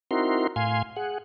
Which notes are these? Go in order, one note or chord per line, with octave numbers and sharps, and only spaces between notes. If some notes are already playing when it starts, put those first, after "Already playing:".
C4 D#4 E4 F#4 A#4 C6
A2 F5 G#5 C6
G#4 F#5